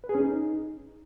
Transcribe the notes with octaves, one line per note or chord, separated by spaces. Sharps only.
B4
G#4
C#4
D#4